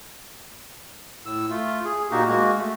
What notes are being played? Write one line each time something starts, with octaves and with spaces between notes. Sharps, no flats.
A2 E6
A3 F4
G#4
A#2 A#3 D#4 F#4 G4
G#3 A#3 F#4
A3